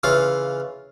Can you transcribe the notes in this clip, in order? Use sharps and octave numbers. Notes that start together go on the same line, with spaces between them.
C#3 E3 F4 F5